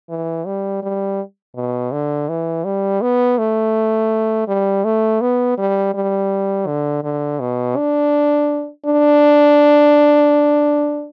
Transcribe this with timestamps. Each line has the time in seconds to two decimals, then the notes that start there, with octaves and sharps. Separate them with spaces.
0.10 E3
0.46 G3
0.83 G3
1.56 B2
1.92 D3
2.29 E3
2.65 G3
3.02 B3
3.38 A3
4.48 G3
4.84 A3
5.21 B3
5.58 G3
5.94 G3
6.67 D3
7.03 D3
7.40 B2
7.76 D4
8.86 D4